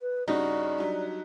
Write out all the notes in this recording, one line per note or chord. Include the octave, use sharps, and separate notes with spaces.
B4
G2 C#3 D#4 F#4 D5
D3 F#3 G3